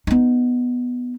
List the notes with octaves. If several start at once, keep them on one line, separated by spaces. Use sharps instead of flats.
B3 D#4